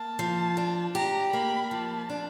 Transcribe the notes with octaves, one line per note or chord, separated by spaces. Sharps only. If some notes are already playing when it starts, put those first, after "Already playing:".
Already playing: A#3 A5
F3
D4
G4 A#5
A#3 B5
F3 A5
D4